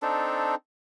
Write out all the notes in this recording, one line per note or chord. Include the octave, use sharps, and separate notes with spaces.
C4 D4 D#4 A4